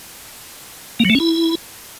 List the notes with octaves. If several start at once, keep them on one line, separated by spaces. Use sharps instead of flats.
A#3
F#3
A3
C#4
E4